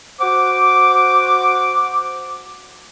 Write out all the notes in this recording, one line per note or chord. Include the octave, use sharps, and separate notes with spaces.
F#4 C5 F#5 D6